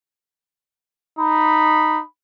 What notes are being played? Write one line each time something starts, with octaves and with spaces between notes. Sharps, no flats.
D#4 B5